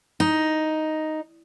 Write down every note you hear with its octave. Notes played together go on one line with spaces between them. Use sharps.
D#4